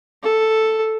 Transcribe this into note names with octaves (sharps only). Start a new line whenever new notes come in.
A4